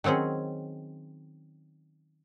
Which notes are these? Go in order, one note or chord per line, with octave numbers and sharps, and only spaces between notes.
D#3 F#3 C4 C#4 G#4